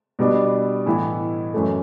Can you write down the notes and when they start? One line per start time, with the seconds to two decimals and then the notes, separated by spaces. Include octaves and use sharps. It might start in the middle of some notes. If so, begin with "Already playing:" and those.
0.19 B2 G3 B3 D4
0.86 A2 E3 B3 E4
1.54 F#2 E3 A3